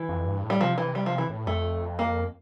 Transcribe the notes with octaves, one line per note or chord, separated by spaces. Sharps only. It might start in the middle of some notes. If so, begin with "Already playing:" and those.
Already playing: E3
F2
G2
A2
G3
C3 F3
E3
G3
F3
E3
A2
F2 A3
A#3